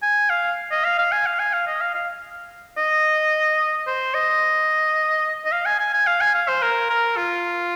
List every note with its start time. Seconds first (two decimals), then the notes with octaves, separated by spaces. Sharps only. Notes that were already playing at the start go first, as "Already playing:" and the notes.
0.02 G#5
0.30 F5
0.71 D#5
0.84 F5
0.98 F5
1.12 G#5
1.26 F5
1.39 G#5
1.53 F5
1.67 D#5
1.81 F5
1.95 F5
2.77 D#5
3.87 C5
4.14 D#5
5.45 D#5
5.52 F5
5.66 G#5
5.79 G#5
5.93 G#5
6.07 F5
6.21 G#5
6.34 F5
6.48 C5
6.62 A#4
6.90 A#4
7.17 F4